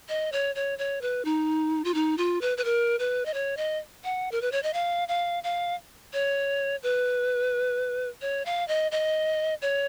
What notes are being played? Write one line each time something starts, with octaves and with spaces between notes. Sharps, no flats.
D#5
C#5
C#5
C#5
B4
D#4
F4
D#4
F4
B4
B4
A#4
B4
D#5
C#5
D#5
F#5
A#4
B4
C#5
D#5
F5
F5
F5
C#5
B4
C#5
F5
D#5
D#5
C#5